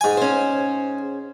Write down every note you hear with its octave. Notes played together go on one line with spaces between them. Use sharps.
G#2 G#5
C#4 C5